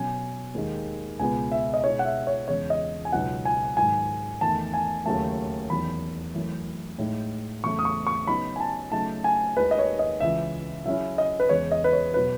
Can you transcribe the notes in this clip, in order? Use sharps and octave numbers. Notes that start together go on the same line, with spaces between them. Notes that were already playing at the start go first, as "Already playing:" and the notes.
Already playing: B2 F#3 C#4 G#5
D#2 D#3 G#3 D#4
C#2 B2 G#3 B3 G#5
E5
D#5
B2 G#3 D#4 C#5
F#5
E5
C#5
E2 C#3 G#3 C#5
D#5
G#5
C#2 B2 F#3 B3 D#4 F#5
G#5
G#2 D#3 F#3 G#5
E2 D#3 A3 A5
G#5
D#2 C#3 F#3 A3 A5
E2 D#3 F#3 B5
F#2 E3 A3 E4
A2 G#3 D#4
E2 C#3 F#3 A3 C#6
D#6
C#6
C#6
C#3 F#3 B3 D#4 B5
G#5
A5
C#3 F#3 A3 D#4 A5
G#5
D#2 D#3 G#3 D#4 B4
D#5
C#5
D#5
C#2 C#3 E3 E5
C#3 F#3 C#4 E4 E5
D#5
B4
E2 C#3 G#3 C#5
D#5
B4
C#5
B2 F#3 B4